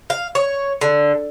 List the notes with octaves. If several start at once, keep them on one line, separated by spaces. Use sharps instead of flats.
F5
C#5
D3